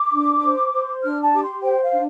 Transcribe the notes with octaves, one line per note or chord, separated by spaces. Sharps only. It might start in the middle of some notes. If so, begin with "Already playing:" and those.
Already playing: D6
D4
C5
C5
D4 F6
A5
G4 D6
C6
C5 G5
F5
D4